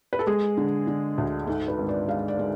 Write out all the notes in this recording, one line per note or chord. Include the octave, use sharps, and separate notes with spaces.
B4
A4
G#3 G#4
D3
D3
D2
G#2 A4
B4
G#1
D5
G#3 F5
D5
G#3